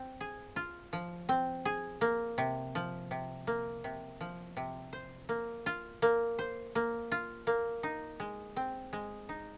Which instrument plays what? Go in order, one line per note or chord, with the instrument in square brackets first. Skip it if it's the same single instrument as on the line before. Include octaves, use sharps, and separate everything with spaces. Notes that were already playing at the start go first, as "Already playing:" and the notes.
Already playing: [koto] C4
G#4
F4
F3
C4
G#4
A#3
C3
F3
C3
A#3
C3
F3
C3
C5
A#3
F4
A#3
C5
A#3
F4
A#3
D#4
G#3
C4
G#3
D#4